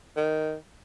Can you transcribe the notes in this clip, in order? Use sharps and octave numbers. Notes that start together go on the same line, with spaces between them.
D#3